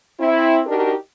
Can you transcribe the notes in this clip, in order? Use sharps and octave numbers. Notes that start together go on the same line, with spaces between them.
C4 E4
D4 D#4 F#4 G4 A#4